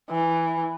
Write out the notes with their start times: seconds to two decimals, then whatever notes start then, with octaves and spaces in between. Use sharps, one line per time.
0.11 E3